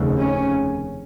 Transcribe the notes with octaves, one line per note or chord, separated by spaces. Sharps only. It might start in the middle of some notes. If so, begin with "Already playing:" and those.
Already playing: F1 D#2 C#3
C#4